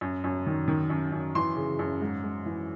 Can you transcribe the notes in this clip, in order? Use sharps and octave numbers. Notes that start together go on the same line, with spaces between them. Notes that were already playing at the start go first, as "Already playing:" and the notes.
F#2
F#2
D#3
D#3
F#2
F#2
E3 C6
C#3
F#2
G#2
G#2
E3